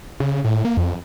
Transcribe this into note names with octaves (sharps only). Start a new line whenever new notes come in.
C#3
A2
A#3
F2